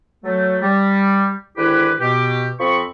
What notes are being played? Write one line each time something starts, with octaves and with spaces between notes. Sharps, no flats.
F#3 A3
G3
G#2 D3 D#3 E4 G4 B4
B2 G4
F2 F3 C4 B5 C#6